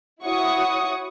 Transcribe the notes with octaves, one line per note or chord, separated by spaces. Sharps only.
E4 F#4 C#5 C#6 D#6